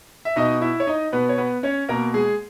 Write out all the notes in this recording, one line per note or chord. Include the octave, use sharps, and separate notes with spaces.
E5
B2 D#4 D#5
E4 E5
C#5
D#4 D#5
B2 B3 B4
C#5
B3 B4
C#4 C#5
B2 A#3 A#4
G#3 G#4